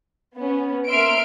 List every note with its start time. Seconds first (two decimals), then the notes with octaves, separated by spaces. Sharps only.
0.36 B3 C#4
0.88 A#3 E5 C6 F6 D7